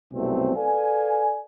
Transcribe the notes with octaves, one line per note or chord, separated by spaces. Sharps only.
C2 F#2 B2 A3 C4
A4 B4 D5 F5 G#5